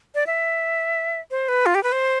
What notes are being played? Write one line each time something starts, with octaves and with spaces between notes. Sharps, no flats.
D5
E5
C5
B4
F4
G4
B4
C5